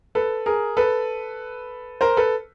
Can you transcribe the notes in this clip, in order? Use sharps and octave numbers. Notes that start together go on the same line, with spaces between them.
A4 B4
G#4 A#4
A4 B4
A#4 C5
A4 B4